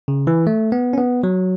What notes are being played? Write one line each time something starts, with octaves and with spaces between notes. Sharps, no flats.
C#3
E3
A3
B3
C#4
B3
F#3